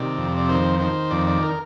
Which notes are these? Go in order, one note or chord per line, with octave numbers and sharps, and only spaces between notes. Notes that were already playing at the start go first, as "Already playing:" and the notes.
Already playing: C3 D#3 D5
F2
D5
D#3 C5
D#3 C5
F2 D5
D5
A#4